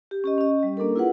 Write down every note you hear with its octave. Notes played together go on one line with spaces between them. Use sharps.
G4
C#4 G4 D#5
C#4 D#5
G3
A#3 D4 A4 A#4
E4 F4 G#4 B4 F#5